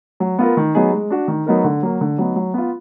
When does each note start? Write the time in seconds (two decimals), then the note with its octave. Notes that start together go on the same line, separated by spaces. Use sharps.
0.20 F#3
0.39 B3 F4 A#4
0.57 D#3
0.75 F#3 B3 D#4 G#4
0.93 G#3
1.10 D4 F#4
1.28 D#3
1.46 F#3 B3 D#4 A#4
1.64 D3
1.83 F#3 A#3
2.01 D3
2.18 F#3 B3 D#4
2.36 F#3
2.54 B3 F4